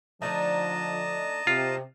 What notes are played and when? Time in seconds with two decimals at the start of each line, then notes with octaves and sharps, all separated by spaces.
0.22 D3 F3 A3 D4 D#4 D#5 A5 A#5
1.47 C3 F4